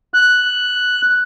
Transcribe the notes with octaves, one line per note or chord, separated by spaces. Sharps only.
F#6